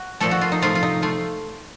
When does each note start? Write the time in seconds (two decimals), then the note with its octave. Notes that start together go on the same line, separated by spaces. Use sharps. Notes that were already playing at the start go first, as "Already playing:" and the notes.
Already playing: F#4
0.20 A#2 F3 A3 A4
0.31 F#4
0.41 F4
0.52 D#4
0.62 C3 F3 A3 F4
0.75 F4
0.83 D#4
1.02 A3 F4